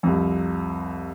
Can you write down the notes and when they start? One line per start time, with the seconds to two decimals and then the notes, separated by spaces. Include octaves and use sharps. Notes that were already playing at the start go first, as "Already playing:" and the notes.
0.03 C2 F2